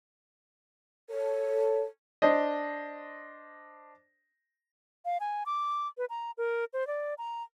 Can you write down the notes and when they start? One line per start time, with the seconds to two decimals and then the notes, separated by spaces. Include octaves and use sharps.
1.10 A4 C#5
2.22 D4 C5 D#5
5.05 F5
5.20 G#5
5.46 D6
5.98 B4
6.10 A#5
6.38 A#4
6.73 C5
6.87 D5
7.18 A#5